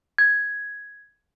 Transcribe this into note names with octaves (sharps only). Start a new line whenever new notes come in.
G#6